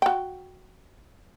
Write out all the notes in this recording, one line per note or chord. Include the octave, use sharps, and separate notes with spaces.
F#4 G5